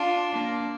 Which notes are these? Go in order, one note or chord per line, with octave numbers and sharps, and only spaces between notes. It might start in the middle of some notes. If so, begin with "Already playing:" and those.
Already playing: D4 F4
A#3 D4